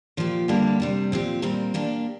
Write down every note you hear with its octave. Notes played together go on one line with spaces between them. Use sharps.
A#2 F3 A#3 G4
D3 G3 A#3 D4 G4
C3 G3 D4
A#2 F3 C4 G4
A#2 G3 C4 A#4
A#2 A#3 D4 G4